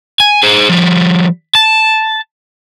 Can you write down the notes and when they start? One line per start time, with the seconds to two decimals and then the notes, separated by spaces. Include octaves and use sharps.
0.20 G#5
0.43 G#4 C5
0.69 F3 G3
1.55 A5